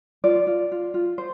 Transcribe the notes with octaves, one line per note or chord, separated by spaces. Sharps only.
F4 D5
F4
F4
F4
C5